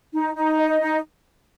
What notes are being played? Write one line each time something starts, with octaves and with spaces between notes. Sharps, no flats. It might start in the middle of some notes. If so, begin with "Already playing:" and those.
D#4
D#4
D#5
D#4